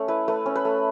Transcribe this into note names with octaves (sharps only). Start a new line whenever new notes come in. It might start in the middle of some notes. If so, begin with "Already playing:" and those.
Already playing: A3 C#4
E4 B4
A3 B4
C#4
B4
A3